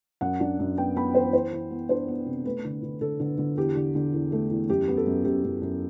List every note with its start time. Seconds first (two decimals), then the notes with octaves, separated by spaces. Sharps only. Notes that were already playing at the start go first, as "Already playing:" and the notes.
0.21 F#2 F#5
0.40 D4
0.59 F#2
0.77 B3 G5
0.96 B3 B5
1.15 E3 C5
1.33 E3 C5
1.53 E3
1.71 B3
1.89 D4 C5
2.08 B3
2.26 C3
2.45 A3 B4
2.65 D3
2.83 D3
3.01 D3 A4
3.20 D3
3.38 D3
3.57 E2 G4
3.76 D3
3.95 D3
4.13 E2
4.32 A3
4.51 E2
4.69 F#2 G4
4.88 B3
4.97 A4
5.06 F#2
5.24 F#2 G4
5.44 F#2
5.62 F#2